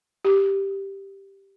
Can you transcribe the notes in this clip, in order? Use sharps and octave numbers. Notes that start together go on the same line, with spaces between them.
G4